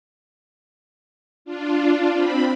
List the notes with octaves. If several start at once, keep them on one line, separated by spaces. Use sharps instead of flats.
D4 F4
C4 B5